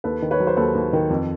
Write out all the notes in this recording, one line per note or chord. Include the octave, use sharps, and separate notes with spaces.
D#2 A4 B4
D#3
B4 C#5
F#3
C5
D#2 A4 B4
D#2
D#3
F2